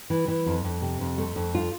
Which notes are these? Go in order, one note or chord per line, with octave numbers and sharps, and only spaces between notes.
E3
E3
F2
F2
C3
F2
A3
F2
F4